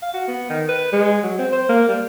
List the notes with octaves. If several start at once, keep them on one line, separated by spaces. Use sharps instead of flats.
F5
F#4
B3
D#3
B4
G#3
F#3
C4
C5
A#3
G3